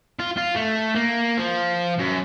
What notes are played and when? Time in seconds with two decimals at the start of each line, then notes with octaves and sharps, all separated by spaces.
0.19 F4
0.37 F4
0.56 A3
0.95 A#3
1.37 F3
1.98 F#2